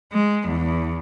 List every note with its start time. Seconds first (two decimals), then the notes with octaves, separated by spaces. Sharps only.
0.13 G#3
0.48 E2